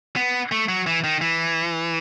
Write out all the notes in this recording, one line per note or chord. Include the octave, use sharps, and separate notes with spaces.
B3
A3
F#3
E3
D#3
E3